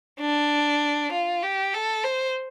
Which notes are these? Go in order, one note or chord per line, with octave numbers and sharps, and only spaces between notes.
D4
F4
G4
A4
C5